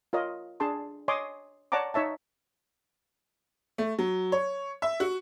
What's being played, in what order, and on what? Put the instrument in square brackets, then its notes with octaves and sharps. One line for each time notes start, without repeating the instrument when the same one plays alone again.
[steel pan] F4 A#4 C#5 D#5
D4 G#4 A5 C6
C#5 D#5 G#5 C6 D6 D#6
C#5 D5 F#5 A5 A#5 D6
D#4 C#5 E5 A5
[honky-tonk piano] A3
F#3
C#5
E5
F#4